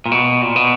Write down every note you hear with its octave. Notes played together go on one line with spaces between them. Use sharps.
A#2
B2
A#2
B2